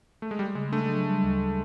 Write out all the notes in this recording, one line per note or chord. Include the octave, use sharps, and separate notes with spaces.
A3
G#3
G3 A3
C#3 G#3
A3 D4
F#3
G3
D2